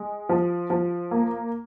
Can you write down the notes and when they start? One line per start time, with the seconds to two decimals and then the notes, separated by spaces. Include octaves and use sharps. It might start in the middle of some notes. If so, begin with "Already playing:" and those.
Already playing: G#3
0.29 F3
0.70 F3
1.11 A#3